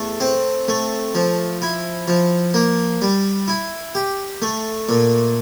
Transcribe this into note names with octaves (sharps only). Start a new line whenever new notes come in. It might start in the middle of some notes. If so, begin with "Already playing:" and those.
Already playing: E2 A3
C4
A3
F3
E4
F3
A#3
G3
E4
G4
A3
A#2